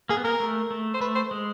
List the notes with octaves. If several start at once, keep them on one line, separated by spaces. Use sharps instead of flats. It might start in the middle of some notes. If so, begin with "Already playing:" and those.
A#3 G#4
B3
A#3 A#4
A3
A3
C5
A3 B4
C5
G#3